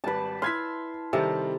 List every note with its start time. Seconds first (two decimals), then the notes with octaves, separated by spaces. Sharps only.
0.04 G#1 G3 B4 A5
0.42 E4 B4 C6 F6 G#6 B6
1.13 C3 D#3 G3 A4 A5 A#5